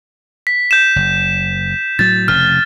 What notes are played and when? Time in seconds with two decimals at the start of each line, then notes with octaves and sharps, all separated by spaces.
0.47 B6
0.71 G6 E7
0.96 F#1
1.99 A2 F#3 A6
2.28 F1 C#3 F6